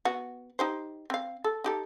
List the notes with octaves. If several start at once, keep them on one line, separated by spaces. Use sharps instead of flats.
B3 F#4
D#4 G4 C5
C4 F5
A4
D#4 G4 A4